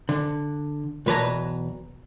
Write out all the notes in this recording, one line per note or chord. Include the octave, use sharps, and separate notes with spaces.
D3
B1 E2 B4 C#5 A5 A#5